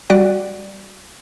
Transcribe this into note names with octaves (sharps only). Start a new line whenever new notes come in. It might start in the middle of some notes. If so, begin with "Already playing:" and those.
G3 F#4 D5 F#5